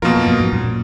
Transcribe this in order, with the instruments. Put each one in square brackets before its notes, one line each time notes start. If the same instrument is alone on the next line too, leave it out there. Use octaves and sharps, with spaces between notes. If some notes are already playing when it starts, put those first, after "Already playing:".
[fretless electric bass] F2 [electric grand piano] B2 A#3 F4 A#4
[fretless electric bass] F#2
F#2
F2 G#2
F#2 A#2